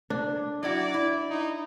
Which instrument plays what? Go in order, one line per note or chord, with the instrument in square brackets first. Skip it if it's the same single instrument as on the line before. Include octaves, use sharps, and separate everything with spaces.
[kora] D4
[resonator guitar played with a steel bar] F#3 E4 F#4 [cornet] D5
[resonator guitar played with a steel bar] E4
[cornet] D#4